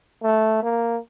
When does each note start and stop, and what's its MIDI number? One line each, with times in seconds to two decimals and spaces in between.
0.23 0.60 57
0.63 0.98 58